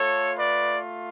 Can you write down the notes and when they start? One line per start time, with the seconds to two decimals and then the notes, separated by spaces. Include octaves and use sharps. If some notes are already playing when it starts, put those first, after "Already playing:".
Already playing: A3 F4 A4 C#5
0.35 B4 D5